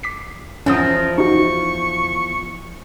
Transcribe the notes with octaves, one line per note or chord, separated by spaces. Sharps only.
D6 B6 C7
E2 F3 C#4 A#4 D#6
D#4 F#4 C#6